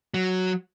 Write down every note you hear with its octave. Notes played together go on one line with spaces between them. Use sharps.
F#3